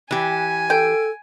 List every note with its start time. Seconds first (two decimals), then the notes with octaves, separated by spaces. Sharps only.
0.11 E3 G4 G#5
0.70 A4 G5